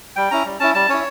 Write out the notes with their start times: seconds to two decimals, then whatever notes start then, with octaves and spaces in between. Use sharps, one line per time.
0.16 G3 G5
0.31 C#4 E4 A#5
0.46 G3
0.60 C#4 E4 A5
0.74 G3 A5
0.89 C#4 E4 C#5